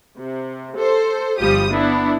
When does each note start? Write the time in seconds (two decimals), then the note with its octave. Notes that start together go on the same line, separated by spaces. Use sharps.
0.18 C3
0.75 A4 C5
1.40 G1 F3 G3 G4 D#6
1.72 B3 D4 E4